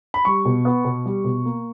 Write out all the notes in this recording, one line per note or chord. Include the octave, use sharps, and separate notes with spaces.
B5
G3 C#6
B2
B3
B2
G3
B2
A#3